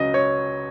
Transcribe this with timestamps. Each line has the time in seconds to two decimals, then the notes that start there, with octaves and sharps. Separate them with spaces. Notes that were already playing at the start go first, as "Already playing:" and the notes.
Already playing: C#2 C#3 F#3 D#5
0.14 C#5